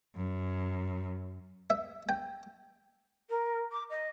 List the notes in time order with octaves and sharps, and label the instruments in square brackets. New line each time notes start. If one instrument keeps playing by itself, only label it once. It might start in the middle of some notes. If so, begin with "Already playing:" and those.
[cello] F#2
[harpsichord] E5
G5
[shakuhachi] A#4
D6
D#5